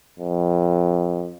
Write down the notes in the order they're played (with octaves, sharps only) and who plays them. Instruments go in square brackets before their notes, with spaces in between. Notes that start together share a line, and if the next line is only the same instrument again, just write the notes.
[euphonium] F2